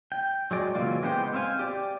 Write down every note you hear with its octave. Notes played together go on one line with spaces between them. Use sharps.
G5
F#3 G#3 D5
C#3 E3 F#3 A#3 F4
G#3 B3 G4 C5 G5
C4 C5 F5 G#5
G4 D5